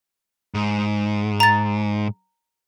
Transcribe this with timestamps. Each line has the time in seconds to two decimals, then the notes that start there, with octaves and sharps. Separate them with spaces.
0.54 G#2
1.40 A#5 A6